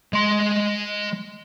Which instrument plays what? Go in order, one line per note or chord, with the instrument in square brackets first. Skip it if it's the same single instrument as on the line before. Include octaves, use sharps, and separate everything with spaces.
[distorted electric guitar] G#3 C6